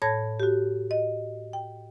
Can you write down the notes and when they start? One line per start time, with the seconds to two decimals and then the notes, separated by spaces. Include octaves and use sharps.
0.02 A2 C#5 A5 B5 G#6 A#6
0.40 F#4 G4
0.91 D#5
1.53 G5